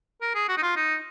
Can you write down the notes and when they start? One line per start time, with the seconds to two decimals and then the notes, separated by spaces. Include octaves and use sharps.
0.22 A#4
0.35 G#4
0.48 F#4
0.58 D#4
0.63 F4
0.76 D#4